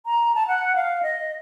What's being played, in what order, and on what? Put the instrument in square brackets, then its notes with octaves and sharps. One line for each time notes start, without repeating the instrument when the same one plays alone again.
[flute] A#5
A5
F#5
F5
D#5